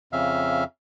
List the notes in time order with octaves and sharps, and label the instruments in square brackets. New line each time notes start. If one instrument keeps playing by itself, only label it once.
[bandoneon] F2 C#3 E5 F5